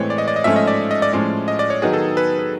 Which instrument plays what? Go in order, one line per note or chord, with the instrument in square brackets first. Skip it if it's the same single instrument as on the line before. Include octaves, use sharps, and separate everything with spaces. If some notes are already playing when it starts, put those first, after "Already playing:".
Already playing: [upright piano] A2 E3 G#3 C4 [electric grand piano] C#5
[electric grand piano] D5
D#5
D5
D#5
[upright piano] G#2 F3 A3 C#4 [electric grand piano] E5
[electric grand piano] D#5
D5
D#5
D5
[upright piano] A2 F3 G#3 C#4 [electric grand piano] D5
[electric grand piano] D#5
D5
C#5
[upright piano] D#3 F#3 B3 [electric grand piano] G#4
[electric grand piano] A4
B4
B4